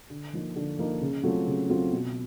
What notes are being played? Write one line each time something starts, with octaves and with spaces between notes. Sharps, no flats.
D3
F3 A#3 D#4
D3
F3 A#3 D#4
C#3
F#3 A3 C4 F4
C#3
F#3 A3 C4 F4
B2